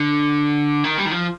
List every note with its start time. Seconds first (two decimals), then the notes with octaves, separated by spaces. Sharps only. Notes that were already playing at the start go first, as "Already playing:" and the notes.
Already playing: D3
0.84 D#3
0.98 G3
1.06 D#3
1.11 F3